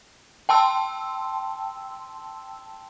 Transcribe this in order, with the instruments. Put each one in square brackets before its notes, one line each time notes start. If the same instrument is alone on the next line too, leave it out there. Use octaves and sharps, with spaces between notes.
[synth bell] G5 A5 C6 E6